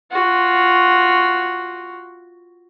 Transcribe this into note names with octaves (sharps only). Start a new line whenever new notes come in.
F4 F#4